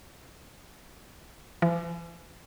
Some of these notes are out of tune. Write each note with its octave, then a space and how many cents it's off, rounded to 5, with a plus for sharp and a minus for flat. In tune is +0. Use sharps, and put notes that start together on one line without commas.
E3 +45